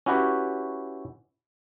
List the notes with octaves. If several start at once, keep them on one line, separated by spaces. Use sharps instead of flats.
C#4 E4 F#4 G4 B4 C#5